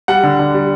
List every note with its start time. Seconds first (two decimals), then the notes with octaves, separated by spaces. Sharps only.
0.08 G3 F#5
0.23 D3
0.39 D3
0.54 G3